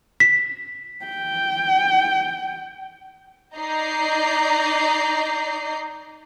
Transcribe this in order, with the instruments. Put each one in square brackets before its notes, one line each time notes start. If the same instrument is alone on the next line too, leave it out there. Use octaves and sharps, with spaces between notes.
[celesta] B6
[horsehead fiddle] G5
[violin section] D#4 D5 D#5 A#5 G6 C7